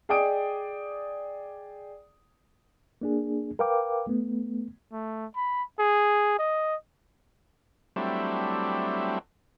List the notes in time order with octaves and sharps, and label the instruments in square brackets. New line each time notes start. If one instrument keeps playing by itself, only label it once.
[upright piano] G#4 D5 D#5 G5 D#6 D7
[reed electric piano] A#3 D4 G#4
A#4 B4 F5 G5 D6
A3 B3
[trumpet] A3
B5
G#4
D#5
[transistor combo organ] F#3 G3 A3 C4 D4 E4